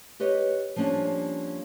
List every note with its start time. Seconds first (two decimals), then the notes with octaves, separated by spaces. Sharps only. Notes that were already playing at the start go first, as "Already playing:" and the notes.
0.20 G4 B4 C#5 D#5
0.76 F3 G3 A#3 C#4 D4